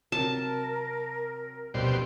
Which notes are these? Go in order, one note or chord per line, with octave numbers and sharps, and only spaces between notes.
C3 F#3 C4 A#4 A5
F1 B2 G3 D4 C5